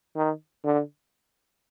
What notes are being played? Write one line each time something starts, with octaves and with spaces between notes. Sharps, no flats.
D#3
D3